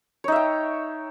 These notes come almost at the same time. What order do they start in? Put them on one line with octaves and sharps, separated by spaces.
C#5 D#4 E5 G5